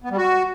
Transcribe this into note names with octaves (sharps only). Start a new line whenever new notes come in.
B3
G3
F#4